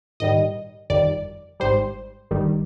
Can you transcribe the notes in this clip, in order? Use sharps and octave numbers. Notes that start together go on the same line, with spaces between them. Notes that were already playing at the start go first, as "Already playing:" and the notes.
A#1 G#2 D#3 G3 D#5
G1 F2 D#3 G3 D5
G#1 G#2 G3 C5
G1 G2 D#3 G3